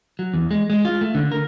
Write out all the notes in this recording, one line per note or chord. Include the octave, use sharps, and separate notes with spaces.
F#3
E2
G#3
G#3
F4
A3
D3
A#4